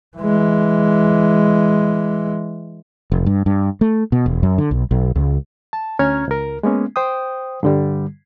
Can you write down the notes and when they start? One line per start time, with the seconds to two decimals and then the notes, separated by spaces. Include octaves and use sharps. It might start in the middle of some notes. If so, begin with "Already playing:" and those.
0.17 E3 G#3
3.12 F1
3.26 G2
3.46 G2
3.81 A3
4.12 B2
4.26 E1
4.43 F#2
4.58 D3
4.71 B1
4.91 B1
5.15 C#2
5.73 A5
5.99 D2 C#4 C#5 A#5 F6 G#6
6.28 C#2 A#4
6.63 G#3 A#3 B3 C#4
6.96 C5 G5 D#6
7.63 G2 D3 G3